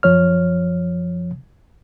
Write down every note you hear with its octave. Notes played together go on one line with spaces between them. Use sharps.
F#2 F3 C#5 F6